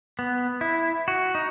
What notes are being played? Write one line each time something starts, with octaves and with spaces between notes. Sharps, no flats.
B3
E4
F#4
D#4